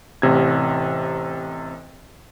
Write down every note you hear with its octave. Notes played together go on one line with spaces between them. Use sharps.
A1 C3 G#6